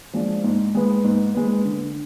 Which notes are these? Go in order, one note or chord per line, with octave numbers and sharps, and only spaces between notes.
F3 G#3 D4
G#2
G#3 B3
G#2
G#3 B3
D3